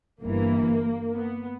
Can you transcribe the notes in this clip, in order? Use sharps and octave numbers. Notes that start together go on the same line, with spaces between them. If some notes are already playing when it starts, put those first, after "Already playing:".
G1 G2 E3 A#3
B3